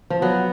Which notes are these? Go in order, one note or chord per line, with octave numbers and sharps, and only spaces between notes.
F3
F#3 B3